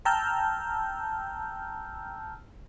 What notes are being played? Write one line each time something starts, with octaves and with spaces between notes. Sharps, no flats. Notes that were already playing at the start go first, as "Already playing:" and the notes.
G5 A5 A#5 E6 F6 G6